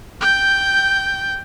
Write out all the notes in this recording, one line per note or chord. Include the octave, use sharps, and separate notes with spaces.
G5 G6